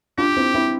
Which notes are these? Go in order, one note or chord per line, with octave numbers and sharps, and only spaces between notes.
D4 F4 G4
C4 E4
C4 E4